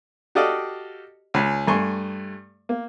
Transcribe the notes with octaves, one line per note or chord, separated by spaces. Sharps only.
F#4 G4 A4 D5 D#5 F5
C#2 G#5 B5
G2 A3 G#5 C6 C#6
A#3